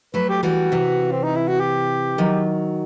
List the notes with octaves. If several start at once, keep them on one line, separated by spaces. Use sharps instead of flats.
F#3 A3 B4
G4
E3 G3 F#4
C3 E3
C4
D#4
E4
F#4
G4
D#3 F#3